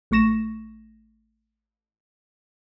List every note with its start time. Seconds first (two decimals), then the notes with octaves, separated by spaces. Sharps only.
0.11 A1 A3 C#6 A#6 E7